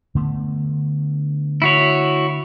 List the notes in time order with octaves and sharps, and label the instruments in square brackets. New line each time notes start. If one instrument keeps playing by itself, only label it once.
[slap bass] D3 A3 B3
[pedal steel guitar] E4 F#4 C#5